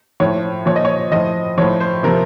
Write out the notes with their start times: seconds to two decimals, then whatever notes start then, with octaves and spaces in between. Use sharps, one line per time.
0.20 A2 F3 C#5
0.66 A#2 F3 C#5
0.76 D#5
0.85 C#5
1.12 A2 F3 D#5
1.58 A2 F3 C#5
1.80 C5
2.03 C3 F3 A#4